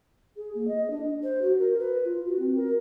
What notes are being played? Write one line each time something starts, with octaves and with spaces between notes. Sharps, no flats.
G#4
A#3
D#5
D4
C5
F#4
A#4
B4
F4
F#4
C4
A#4